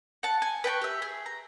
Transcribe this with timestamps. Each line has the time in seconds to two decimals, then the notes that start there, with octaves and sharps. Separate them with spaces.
0.23 F#5 A5
0.42 G#5
0.64 B4 G5 A5 C#6
0.82 G4 E5
1.02 G#4
1.26 A#5